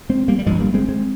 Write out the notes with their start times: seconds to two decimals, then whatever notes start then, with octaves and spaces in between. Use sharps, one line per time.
0.09 G#3 C4
0.28 G3 A#3
0.39 G3
0.46 G1 G2 F3 G#3
0.60 G3 A#3
0.74 G#3 C4
0.89 G#3 C4